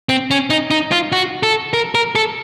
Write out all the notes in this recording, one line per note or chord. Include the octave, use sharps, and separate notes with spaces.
C4
C#4
D#4
D#4
F4
F#4
A4
A#4
A#4
A4